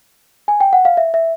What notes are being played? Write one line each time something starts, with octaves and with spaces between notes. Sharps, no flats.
G#5
G5
F#5
F5
E5
E5